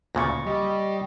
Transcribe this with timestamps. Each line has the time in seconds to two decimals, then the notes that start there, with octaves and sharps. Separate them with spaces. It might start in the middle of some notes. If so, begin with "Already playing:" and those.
0.15 D2 A#2 C#3 C#6 A6 A#6
0.46 G3 D#5